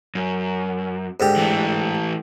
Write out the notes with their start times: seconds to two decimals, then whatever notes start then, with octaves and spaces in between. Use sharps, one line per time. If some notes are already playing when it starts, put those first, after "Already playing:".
0.15 F#2
1.20 G#2 D3 G4
1.37 E3 A3